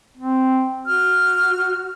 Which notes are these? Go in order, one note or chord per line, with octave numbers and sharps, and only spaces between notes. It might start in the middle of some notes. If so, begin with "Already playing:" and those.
C4
F#4 F6